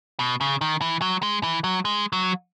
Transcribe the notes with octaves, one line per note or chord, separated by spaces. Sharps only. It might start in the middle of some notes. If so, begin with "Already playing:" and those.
B2
C#3
D#3
E3
F#3
G#3
E3
F#3
G#3
F#3